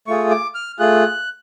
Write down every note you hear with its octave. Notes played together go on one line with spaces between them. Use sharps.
A3 F4 G#4 C#6
D6
F6
A3 F4 G#4 F#6